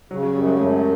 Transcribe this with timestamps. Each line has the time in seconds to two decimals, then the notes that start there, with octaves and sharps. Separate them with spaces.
0.11 C#3 F#3
0.23 F#3
0.35 F#2 G3
0.47 G#3
0.59 F#2 A3